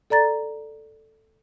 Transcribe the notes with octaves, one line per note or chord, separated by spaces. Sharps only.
A4 D5 A#5 A6